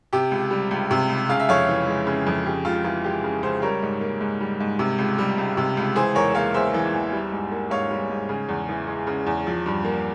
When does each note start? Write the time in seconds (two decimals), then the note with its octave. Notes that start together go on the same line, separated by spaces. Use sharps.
0.13 C3 G4
0.32 C#2
0.51 G3
0.71 C#2
0.91 C3
1.10 C#2
1.29 C#3 F5
1.40 E5
1.49 F2 C#5 F5
1.68 E3
1.87 G#3
2.07 C#3
2.27 F2
2.46 C#3 G4
2.65 C#2 F4
2.84 E3 F4
3.04 G#3 G4
3.24 C#3
3.43 C#2 G#4 C5
3.62 G3 A#4 C#5
3.83 G#2
4.01 A#3
4.21 G#2
4.41 G3
4.60 G#2
4.79 C3
4.98 C#2
5.18 G3
5.38 C#2
5.57 C3
5.77 C#2
5.96 E3 G#4 C5
6.15 E2 A#4 C#5
6.35 A#3 C#5 F5
6.54 E2 C5 E5
6.74 E3
6.93 E2
7.13 G3
7.32 G#2
7.51 A#3
7.70 G#2 C#5 F5
7.91 G3
8.10 G#2
8.29 C#3
8.49 E2
8.69 E3
8.87 G#3
9.07 C#3
9.27 E2
9.47 F3
9.66 G2
9.84 A#3